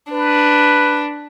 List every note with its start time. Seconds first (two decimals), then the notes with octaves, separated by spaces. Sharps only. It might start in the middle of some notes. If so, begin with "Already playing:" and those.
0.12 D4 B4